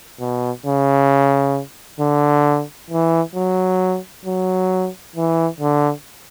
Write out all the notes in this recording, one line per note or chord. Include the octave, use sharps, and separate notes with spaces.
B2
C#3
D3
E3
F#3
F#3
E3
D3